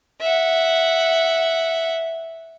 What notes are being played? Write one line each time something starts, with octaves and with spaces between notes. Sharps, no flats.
E5 F#5